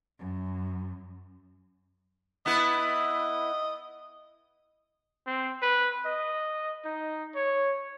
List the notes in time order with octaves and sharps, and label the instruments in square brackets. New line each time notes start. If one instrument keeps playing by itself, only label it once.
[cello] F#2
[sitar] B3 E4 B4 [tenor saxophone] D#5
[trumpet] C4
B4
D#5
D#4
C#5